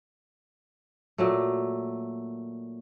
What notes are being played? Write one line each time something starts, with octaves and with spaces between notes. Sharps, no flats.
A#2 F#3 A3